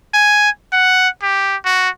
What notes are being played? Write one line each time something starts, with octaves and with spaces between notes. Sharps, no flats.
G#5
F#5
G4
F#4